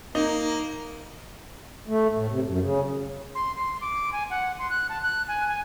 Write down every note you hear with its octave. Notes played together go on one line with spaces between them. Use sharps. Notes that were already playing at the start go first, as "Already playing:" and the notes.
A#3 D#4
A3
A2
C3
F#2
C#3
C6
C6
D6
G#5
F#5
C6
F#6
A5
F#6
G#5
G#5